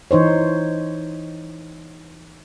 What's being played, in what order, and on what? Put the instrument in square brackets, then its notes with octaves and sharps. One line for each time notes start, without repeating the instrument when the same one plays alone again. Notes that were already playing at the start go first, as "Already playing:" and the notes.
[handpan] E3 D#4 C5 C#5